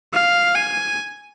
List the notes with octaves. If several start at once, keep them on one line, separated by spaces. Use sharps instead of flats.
F5
G#5